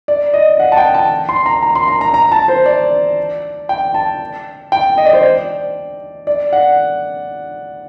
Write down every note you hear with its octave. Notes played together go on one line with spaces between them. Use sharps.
D5
D#5
F#5
A5
G5
A5
C6
A#5
A#5
C6
A#5
A#5
A#5
A5
C5
D5
G5
A5
G5
D#5
D5
C5
D5
D5
F#5